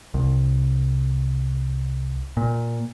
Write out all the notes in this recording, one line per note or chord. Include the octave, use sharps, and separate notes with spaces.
C2
A#2